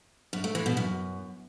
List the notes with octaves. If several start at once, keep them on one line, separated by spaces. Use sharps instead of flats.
F#2
A3
E3
B2
F#2